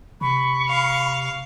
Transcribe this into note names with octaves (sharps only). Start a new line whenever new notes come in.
C3 B5 C#6
F5